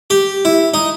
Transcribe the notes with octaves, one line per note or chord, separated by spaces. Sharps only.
G4
E4
D#4